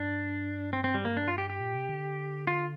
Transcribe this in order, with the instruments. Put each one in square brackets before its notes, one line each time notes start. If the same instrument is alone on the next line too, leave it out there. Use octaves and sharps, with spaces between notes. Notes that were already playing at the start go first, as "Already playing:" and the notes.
Already playing: [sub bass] G2 [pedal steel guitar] D4
[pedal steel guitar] C4
C4
G3
A#3
D4
F4
G4
G4
[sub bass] A#2
C3
D3
[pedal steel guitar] F4